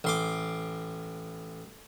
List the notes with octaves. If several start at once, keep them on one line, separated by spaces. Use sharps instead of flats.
A1 C6 D6